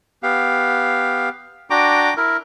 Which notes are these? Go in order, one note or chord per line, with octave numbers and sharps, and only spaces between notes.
B3 G4 F5
D4 F#4 G5 A#5 D6
E4 A#4